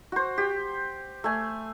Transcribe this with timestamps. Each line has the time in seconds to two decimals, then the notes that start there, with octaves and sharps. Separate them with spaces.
0.12 F#4 C5
0.38 G4
1.24 A3 G#5